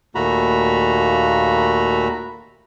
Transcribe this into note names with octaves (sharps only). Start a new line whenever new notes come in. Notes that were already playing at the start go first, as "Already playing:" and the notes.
D#2 A#2 A3 F#4 A#5 B5